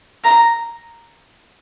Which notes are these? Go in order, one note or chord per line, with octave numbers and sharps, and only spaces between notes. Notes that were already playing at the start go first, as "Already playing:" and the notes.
A#5